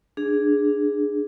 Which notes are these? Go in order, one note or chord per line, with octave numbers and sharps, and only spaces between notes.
D4 G#4